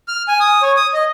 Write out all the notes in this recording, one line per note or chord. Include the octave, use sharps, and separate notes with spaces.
F6
G#5
D#6
C#5
D#6
D#5